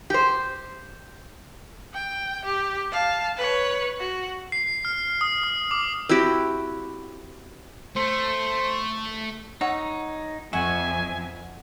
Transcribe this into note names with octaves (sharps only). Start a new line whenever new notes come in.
G4 C5
G5
G4
F5 A5
B4 C#5
F#4
C7
F6
D#6
D#6
D6
C4 E4 F#4 G4
A3 C5
D#4 C#5 F#5 E6
F2 E5 F#5 G#5 C#6